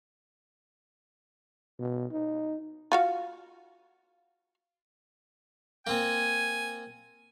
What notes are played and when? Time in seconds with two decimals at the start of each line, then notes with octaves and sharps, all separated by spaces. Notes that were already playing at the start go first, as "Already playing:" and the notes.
1.79 B2
2.12 D#4
2.92 F4 F#4 F5
5.87 A#3 C4 G#5